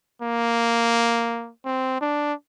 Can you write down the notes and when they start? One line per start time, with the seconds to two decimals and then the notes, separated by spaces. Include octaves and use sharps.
0.22 A#3
1.65 C4
2.01 D4